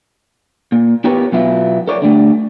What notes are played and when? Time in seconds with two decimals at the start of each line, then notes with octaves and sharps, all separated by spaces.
0.72 A#2
1.04 B3 E4 G4 A#4 B4 C#5
1.32 B2 F#3 B3 E4 F4
1.88 A4 A#4 C#5 D5
2.02 D3 G3 A3